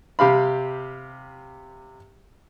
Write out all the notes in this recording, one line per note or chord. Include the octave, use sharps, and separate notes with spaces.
C3 G4 F5 B5